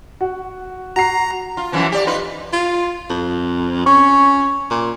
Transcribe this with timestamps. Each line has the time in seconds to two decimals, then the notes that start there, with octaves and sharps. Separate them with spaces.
0.21 F#4
0.96 F#4 A#5 C7
1.57 F4
1.72 F#2 E3 F3
1.92 G4 D5
2.07 D#4 F4 B4
2.53 F4
3.10 F2
3.86 C#4 C#6
4.70 A#2